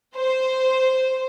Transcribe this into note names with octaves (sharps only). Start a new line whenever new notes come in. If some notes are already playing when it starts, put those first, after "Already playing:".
C5